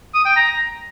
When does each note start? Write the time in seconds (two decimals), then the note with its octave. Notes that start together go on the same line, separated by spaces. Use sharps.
0.14 D#6
0.25 G5
0.36 A#5